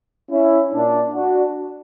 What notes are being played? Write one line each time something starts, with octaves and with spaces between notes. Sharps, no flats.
C#4 E4
A#2 A#3 D4
D4 F#4